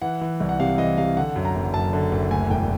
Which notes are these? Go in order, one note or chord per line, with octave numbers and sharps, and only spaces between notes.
E3 F#5
E3
C2
F#5
C3 F5
E3 D#5
C3 F5
D3 F#5
F#2
A#5
F#1
F#2 A5
D3
F#1
D2 G#5
E1 G5